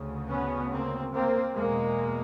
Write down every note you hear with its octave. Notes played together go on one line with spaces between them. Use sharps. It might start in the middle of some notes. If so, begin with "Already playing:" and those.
Already playing: D2 C#3
B3 C#4
A#3 C4
A#3 C4
E2 B2 G#3 A#3